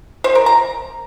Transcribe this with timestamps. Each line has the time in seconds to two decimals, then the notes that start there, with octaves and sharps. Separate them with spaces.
0.24 C5
0.35 A#4
0.46 A#5